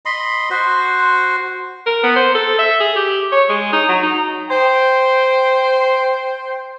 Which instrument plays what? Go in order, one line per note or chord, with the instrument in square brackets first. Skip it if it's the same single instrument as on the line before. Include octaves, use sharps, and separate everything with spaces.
[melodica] D#5 B5 C6
F#4 C5
[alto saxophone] A#4
B3
C5
A4
E5
G#4
G4
C#5
G#3
D#4
F#3
D#4
[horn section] C5 G5